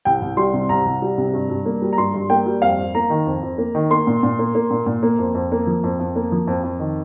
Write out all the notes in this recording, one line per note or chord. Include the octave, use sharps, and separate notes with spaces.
C2 G5
C2
G3 C6
C3
C2 A#5
C2
G3
C3
G2
G2
A#3
G3
A#5
G2 C6
G2
A#3 G5
G3
F2 F5
F2
A#3 A#5
D#3
F2
F2
A#3
D#3
A#3 C6
A#2
A#2
A#3
A#3
A#2
A#2
A#3
F2
F2
A#3
F3
F2
F2
A#3
F3
F2
F2
D#3